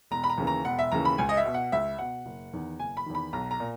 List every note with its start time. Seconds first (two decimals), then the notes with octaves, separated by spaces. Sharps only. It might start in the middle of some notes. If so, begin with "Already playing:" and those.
0.11 E1 A#5
0.24 B5
0.30 A#5
0.38 D#2 C#3 E3
0.47 A#5
0.65 E1 F#5
0.79 E5
0.92 D#2 C#3 E3 A#5
1.05 B5
1.18 C#2 G#5
1.29 D#5
1.37 E5
1.46 B2
1.54 F#5
1.72 C#2 E5
1.99 B2 F#5
2.26 F#1
2.53 E2 D#3
2.79 F#1 G#5
2.97 B5
3.06 E2 D#3
3.15 B5
3.33 B1 A#5
3.51 A#5
3.60 A#2